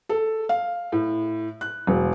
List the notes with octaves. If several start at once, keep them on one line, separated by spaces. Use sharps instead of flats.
A4
F5
A2
F#6
E1